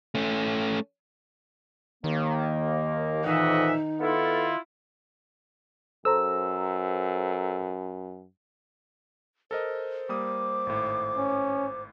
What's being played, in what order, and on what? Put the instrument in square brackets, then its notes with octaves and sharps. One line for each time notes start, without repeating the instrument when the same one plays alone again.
[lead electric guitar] A3 C#4
[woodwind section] D#2 A#3 [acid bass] D#3
[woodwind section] F2 A#2 E3 [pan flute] D#4 [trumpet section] D#5 E5 F#5
[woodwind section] B3 A4 [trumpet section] E4 F4
[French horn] F#2 [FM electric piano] A4 C5 A#5 [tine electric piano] E6
[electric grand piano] A4 A#4 D#5 [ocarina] C5
[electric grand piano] G3 A#3 D#6 [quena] D6
[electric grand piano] G#1 A2
[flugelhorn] C#4